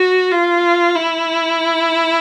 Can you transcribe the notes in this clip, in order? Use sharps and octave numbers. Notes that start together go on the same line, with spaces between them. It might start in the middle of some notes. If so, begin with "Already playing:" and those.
Already playing: F#4
F4
E4